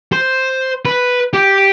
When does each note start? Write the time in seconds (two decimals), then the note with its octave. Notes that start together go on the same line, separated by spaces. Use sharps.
0.12 C5
0.85 B4
1.34 G4